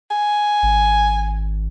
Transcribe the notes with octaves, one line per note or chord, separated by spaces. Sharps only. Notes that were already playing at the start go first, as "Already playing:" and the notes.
G#5
G#1